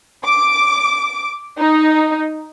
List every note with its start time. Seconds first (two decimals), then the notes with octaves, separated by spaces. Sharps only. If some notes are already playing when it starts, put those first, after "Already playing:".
0.25 D6
1.57 D#4